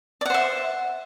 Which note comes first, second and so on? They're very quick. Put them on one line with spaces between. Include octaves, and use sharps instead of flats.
D5 F#5 C5 E5